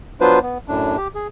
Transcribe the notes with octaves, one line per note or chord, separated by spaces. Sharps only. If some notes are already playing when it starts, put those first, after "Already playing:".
F#3 B3 D4 F4 B4 C5
B3
F#2 A2 D4
G4
G#4